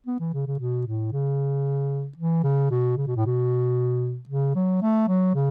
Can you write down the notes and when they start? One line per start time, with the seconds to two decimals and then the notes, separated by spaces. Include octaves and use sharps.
0.07 B3
0.20 E3
0.34 C#3
0.47 C#3
0.59 B2
0.87 A2
1.13 C#3
2.18 E3
2.44 C#3
2.71 B2
2.97 C#3
3.07 B2
3.16 A2
3.26 B2
4.29 C#3
4.55 F#3
4.82 A3
5.08 F#3
5.35 C#3